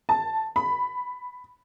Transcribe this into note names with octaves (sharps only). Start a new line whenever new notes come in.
A5
B5